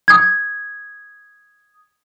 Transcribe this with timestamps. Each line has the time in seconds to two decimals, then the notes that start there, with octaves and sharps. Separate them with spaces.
0.08 D#6 G#6